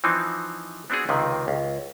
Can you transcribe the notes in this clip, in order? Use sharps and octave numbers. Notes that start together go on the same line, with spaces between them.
E3 F3 C4 D#4
B3 C4 D4 F#4 G#4
C#2 C3 D#3
C#2